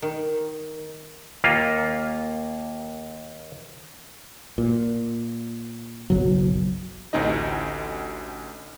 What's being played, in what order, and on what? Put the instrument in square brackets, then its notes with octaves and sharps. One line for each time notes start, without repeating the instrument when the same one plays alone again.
[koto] D#3
[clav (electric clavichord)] D#2 A#3 F4
[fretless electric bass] A#2
[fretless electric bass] F#1 B1 [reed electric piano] F#3
[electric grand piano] A1 D2 C4 D#4 D#5